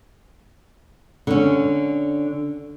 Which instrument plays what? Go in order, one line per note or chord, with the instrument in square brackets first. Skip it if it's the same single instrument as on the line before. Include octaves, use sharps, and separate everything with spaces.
[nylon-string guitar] D3 C#4